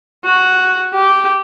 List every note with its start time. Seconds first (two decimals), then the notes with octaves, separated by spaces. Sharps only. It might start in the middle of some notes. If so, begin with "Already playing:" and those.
0.24 F#4
0.94 G4